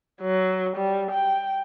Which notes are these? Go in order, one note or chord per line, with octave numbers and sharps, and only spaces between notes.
F#3
G3
G5